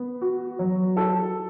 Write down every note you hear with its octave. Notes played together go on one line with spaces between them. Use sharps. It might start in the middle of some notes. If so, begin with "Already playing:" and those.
Already playing: B3
F#4
F#3
A4